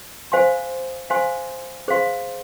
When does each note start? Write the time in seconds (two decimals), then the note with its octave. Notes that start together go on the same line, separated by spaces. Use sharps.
0.32 C5 F5 G#5 C6
1.10 C5 F5 G#5 C6
1.88 G#4 C5 F5 C6